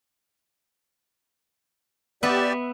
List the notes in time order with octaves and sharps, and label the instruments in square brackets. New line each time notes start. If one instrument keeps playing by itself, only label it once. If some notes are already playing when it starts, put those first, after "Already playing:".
[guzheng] B3 E5 [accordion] G4 D5